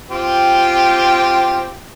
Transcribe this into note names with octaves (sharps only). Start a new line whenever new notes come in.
C4 F4 G4